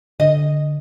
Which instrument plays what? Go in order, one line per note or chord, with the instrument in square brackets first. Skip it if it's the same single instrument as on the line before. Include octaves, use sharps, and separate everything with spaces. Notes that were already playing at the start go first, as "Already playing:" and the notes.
[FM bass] D3 [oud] D#5